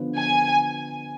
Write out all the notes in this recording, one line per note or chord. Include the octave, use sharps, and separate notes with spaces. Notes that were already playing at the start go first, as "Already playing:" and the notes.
Already playing: D3 F3 B3
G#5